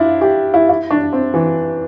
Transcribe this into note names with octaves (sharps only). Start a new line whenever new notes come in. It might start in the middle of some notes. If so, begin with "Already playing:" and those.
Already playing: D4 E4 F4
G4
E4
E4
D4
C4
E3